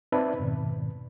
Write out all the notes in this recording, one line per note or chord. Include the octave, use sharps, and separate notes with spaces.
C4 D#4 B4 D5 E5 A5
F2 G#2 B2 D#3